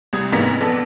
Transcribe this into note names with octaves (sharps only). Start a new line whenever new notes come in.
C2 G3 D#6 G#6
A1 G#2 C3 A#3 B3 B6
A#1 B3 D4 A4